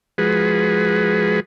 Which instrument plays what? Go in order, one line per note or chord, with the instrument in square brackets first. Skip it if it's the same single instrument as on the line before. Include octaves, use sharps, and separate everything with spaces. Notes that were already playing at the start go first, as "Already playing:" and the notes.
[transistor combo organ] F3 G#3 F#4 G#4 B4